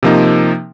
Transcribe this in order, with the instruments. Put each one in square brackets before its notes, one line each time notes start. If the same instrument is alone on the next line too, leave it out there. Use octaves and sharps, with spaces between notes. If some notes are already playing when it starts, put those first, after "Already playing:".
[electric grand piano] C3 F3 A#3 D#4